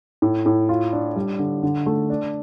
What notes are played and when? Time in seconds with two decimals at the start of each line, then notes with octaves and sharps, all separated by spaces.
0.22 A2
0.46 A2
0.69 F4
0.93 D4
1.16 G3
1.39 D3
1.63 D3
1.86 A3
2.10 D4